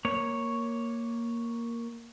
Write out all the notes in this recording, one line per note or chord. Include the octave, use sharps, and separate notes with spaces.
A#3 C#5